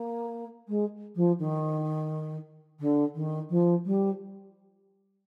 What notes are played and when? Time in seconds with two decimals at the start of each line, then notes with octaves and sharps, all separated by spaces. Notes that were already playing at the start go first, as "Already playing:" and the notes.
Already playing: A#3
0.69 G#3
1.16 F3
1.39 D#3
2.80 D3
3.15 D#3
3.50 F3
3.85 G3